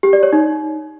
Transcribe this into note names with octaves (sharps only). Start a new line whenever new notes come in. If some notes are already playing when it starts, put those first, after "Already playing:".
G4
D5
C#5
D#4